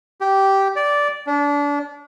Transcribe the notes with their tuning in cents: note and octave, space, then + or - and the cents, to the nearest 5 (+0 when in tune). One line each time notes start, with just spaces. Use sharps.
G4 -10
D5 -10
D4 -30